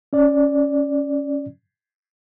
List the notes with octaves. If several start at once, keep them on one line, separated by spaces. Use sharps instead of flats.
C#4 D5